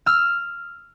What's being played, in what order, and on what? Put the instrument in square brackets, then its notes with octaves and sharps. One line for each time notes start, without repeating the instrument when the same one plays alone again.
[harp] E6 F6